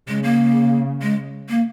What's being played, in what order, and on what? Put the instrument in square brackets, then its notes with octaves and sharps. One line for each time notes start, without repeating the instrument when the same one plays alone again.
[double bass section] C#3 [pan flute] G#3
[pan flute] A#3
G#3
A#3